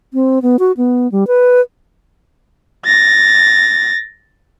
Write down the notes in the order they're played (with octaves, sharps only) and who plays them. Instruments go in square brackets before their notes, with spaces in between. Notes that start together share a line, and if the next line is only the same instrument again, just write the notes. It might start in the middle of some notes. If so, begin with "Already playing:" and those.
[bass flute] C4
B3
F#4
B3
G3
B4
[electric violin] A6 A#6